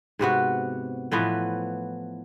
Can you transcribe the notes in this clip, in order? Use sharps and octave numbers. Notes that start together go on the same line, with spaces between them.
G#2 C3 B3 F#4
A2 E3 F3 B3